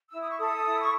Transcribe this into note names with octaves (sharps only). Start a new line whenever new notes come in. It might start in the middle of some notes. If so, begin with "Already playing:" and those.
E4 E6
D#6
C#6
A4 D#6
E4
C#6